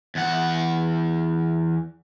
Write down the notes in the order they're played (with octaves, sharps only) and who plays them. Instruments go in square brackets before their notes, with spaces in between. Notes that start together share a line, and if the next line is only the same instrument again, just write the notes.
[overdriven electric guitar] E2 F#5